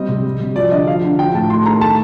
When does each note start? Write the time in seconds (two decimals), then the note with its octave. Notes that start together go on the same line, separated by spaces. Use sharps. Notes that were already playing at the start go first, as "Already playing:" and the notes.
Already playing: G3 C4 D#5
0.09 C3
0.25 G3
0.40 C3
0.56 F3 D5
0.71 D3 D#5
0.87 F3 F5
1.04 D3
1.19 F3 G5
1.34 A2 A5
1.50 A3 C6
1.66 D#3 A#5
1.81 A3 A5